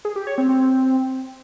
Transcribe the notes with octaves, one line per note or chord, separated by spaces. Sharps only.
G#4
G4
C#5
C4
C4